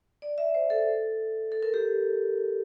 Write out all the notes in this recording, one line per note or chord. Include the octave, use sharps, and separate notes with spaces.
D5
E5
C5
A4
A4
A#4
G4